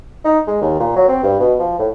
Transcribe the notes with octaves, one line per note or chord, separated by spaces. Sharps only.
D#4
G#3
D#2
A#2
F#3
C4
G2
B2
F3
A2